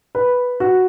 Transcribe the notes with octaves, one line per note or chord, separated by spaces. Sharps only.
B4
F#4